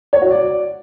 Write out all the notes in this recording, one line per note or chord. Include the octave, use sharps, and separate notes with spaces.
C#5
F#4
D5